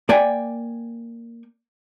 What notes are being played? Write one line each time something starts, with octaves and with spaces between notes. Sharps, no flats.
A#3 D5 G5 G#5